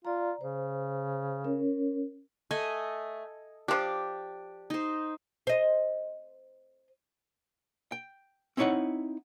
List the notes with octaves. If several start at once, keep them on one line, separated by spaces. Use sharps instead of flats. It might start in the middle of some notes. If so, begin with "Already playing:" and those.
F4 D5 A#5
C#3 C5
C#4 A#4 C#5
A3 A4 D#5 G#5
F3 D4 G4
D#4 C5
C5 D#5
G5
C4 D#4 E4 C#5 D#5 F#5